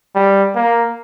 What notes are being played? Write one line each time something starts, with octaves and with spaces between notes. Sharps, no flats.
G3
A#3